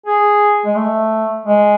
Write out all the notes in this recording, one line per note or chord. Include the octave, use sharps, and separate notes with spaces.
G#4
G#3
A3
G#3